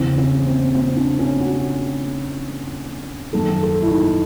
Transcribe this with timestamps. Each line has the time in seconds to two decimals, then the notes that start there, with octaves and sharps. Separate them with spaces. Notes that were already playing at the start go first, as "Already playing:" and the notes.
Already playing: E2 C#3 E3 C4
0.18 C#4
0.47 C4
0.75 C4
0.96 D4
1.19 C#4
1.40 F#4
3.33 F#2 D#3 A4
3.63 A4
3.82 E4
3.91 D#4